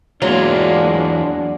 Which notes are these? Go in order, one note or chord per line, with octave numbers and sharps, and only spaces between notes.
E2 F#3 G#3 A#3 D4 F4